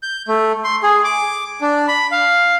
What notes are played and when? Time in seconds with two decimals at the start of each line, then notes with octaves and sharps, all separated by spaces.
0.03 G6
0.28 A3
0.64 C6
0.83 G#4
1.04 D6
1.61 D4
1.88 B5
2.11 F5